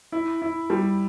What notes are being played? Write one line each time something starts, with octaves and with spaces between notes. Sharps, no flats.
E4
E4
G3